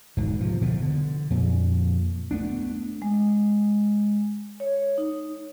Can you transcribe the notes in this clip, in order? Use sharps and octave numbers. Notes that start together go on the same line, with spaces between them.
E1 G#2 B2 D3
C3 F3
B2 D3 E3 F3
D3
F2 A#2
A3 B3 D4
G#3
C#5
D#4